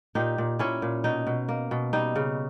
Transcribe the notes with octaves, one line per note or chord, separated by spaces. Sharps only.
A#2 D#4 G4
A#2
A#2 C#4 E4
A#2
B2 D#4
B2
A#3
B2
G3 D#4
C#3